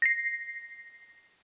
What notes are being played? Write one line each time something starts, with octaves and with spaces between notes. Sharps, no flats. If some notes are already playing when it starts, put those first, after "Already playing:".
A#6 C7